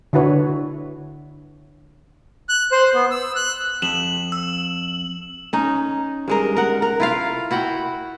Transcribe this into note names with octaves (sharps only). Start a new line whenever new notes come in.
D3 E4 F#4 B4 C#5
F#6
C5
B3
E6
F#6
F2 E7 F#7
E6
C#4 D#4
G2 G#3 A#4
A#4 F#5
A#4
E4 F4 F5
E4 F#4 F#5 G5